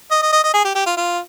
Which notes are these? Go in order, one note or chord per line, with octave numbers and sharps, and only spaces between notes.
D#5
D#5
D#5
D#5
G#4
G4
G4
F4
F4